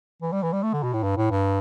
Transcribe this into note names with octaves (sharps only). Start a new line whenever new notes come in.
E3
G3
E3
G3
A3
D3
B2
A2
G2
A2
G2